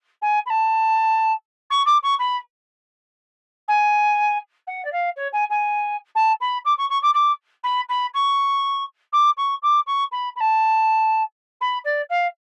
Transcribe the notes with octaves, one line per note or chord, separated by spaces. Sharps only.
G#5
B5
A5
C#6
D6
C#6
B5
G#5
F#5
D5
F5
C#5
G#5
G#5
A5
B5
D6
C#6
C#6
D6
D6
B5
B5
C#6
D6
C#6
D6
C#6
B5
B5
A5
B5
D5
F5